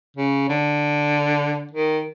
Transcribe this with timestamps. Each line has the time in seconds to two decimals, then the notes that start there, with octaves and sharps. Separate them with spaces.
0.17 C#3
0.49 D3
1.71 D#3